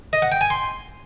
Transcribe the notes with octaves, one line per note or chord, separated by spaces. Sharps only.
D#5
F#5
G5
G#5
C6